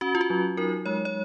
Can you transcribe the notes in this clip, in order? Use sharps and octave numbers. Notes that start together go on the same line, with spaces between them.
C#4 F#4
F4
F#4
F#3
D#4 A#4
G#3 C#5
C#5